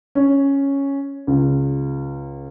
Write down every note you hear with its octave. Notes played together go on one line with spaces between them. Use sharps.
C#4
C#2